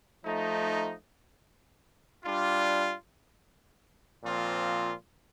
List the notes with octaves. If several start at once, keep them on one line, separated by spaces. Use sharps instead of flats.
F3 A3 D#4
G3 D4 F4
A#2 F3 C4 F4